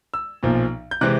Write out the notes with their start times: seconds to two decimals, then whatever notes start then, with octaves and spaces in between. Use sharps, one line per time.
0.14 E6
0.43 B1 A#2 F3
0.91 G6
1.01 C3 E3 G#3 C4 F#6